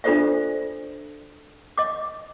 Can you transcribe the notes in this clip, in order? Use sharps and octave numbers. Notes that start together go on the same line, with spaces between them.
D4 F4 A4 C5 D5 E5
D#5 D6